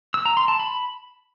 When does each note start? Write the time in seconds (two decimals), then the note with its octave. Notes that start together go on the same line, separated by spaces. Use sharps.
0.14 E6
0.25 A#5
0.37 C6
0.48 A5
0.59 B5